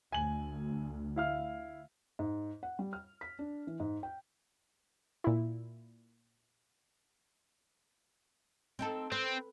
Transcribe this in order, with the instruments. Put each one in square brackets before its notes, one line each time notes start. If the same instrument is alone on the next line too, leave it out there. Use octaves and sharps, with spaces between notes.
[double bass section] D2 [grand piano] G#5 F#7
[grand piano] E4 F5 F6
[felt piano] G#2
F#5
G3
F6
B6
D4
E3
G#2
G5
[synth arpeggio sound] A#2 E4
[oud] C4 D#4 A4
[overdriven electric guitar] C4 [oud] B4